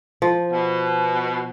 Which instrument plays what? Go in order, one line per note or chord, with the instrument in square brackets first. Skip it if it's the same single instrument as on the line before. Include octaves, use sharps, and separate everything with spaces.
[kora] F3
[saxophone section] B2